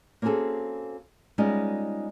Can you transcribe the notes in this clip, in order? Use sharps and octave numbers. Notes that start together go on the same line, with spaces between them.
A#3 C4 C#4 F#4 G#4 A4
G3 G#3 B3 C#4 D#4 F4